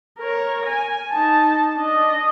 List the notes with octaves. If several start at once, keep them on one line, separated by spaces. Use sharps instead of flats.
A#4 C#5
G#5
D#4 A5
D4 D#5